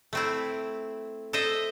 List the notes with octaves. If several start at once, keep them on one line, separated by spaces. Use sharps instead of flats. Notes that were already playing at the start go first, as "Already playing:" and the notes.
A3 C4 E4
A4 C5 D#5 E5